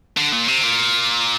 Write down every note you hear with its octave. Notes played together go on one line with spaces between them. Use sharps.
D3
A#2
C3
A#2